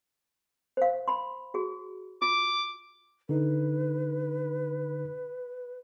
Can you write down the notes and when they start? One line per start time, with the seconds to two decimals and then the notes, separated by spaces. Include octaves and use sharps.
0.77 C5 F5
1.08 B5 C6
1.54 F#4 G#4
2.22 F4 D6
3.29 D3 D#4 B4